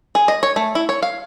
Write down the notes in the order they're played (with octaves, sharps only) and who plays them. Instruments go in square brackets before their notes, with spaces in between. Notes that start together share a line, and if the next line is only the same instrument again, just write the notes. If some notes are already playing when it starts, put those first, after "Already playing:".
[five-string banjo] G#4
D#5
C#5
A3
E4
C#5
F5